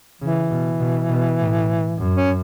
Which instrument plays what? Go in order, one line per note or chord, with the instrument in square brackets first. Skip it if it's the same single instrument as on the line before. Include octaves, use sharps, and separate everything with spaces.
[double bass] C#3 [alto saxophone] E3
[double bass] B2
B2
B2
A2
F#2
[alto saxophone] C#4